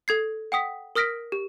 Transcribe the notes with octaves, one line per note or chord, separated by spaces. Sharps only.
A4 G#6 C7
F#5 G5 D#6 B6
A#4 D#6 F6 A#6 B6 D7
G4